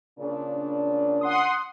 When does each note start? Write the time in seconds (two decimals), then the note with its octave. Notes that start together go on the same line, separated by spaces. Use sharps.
0.18 A#2 C#3 D4
1.21 F#5 C6 D#6